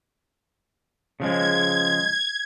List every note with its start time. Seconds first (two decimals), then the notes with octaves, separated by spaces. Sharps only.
1.20 C#3 F3 G#3 G#6